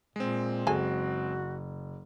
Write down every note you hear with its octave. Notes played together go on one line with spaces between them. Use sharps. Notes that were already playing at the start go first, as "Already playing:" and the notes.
A#2 G#3 C4
F#1 F#4 G#4 A4 G#5